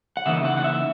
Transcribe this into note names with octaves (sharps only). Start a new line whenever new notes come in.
F#5
C#3 E3 A#3 D#4 E5
F#5
F#5
E5